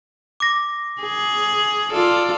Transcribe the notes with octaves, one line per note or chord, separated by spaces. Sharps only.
D6 A#6
G#4
F4 A4 D5